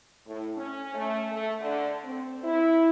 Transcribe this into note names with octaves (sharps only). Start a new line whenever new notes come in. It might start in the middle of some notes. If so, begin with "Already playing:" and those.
A2
C#4
A3
A3
D3
C4
E4